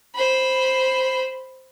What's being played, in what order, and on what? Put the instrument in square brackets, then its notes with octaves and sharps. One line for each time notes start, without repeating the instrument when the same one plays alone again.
[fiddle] C5 B5